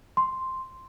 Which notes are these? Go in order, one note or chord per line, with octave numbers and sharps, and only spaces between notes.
C6